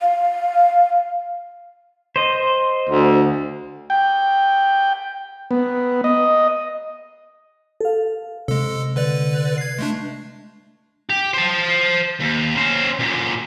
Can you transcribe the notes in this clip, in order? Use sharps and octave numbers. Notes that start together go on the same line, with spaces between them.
F5
C5 D#5
D2
G5
B3
D#5
A4 F5
C3 G#3 A4
D3 B4 D5
G#6 C7
G#3 A3 D4
G4
C5 A5
D#2
C#4 C5
F#2 A#2